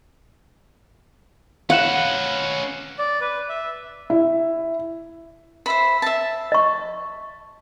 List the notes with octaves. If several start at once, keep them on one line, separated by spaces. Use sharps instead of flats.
C#4 B4 F5 F#5 F#6 E7
D5
B4
E5
E4
C5 E5 B5
E5 A5
D#5 C#6